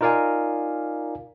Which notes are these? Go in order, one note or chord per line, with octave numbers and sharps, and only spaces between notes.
D#4 F4 A#4 D5 F5 G#5